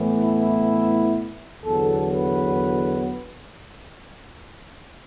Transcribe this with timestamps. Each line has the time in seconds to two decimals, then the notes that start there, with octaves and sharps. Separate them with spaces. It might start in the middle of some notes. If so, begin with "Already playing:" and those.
Already playing: A2 E3 B3
0.22 E4
1.64 E2 D3 F#3 B3 A4
2.11 B4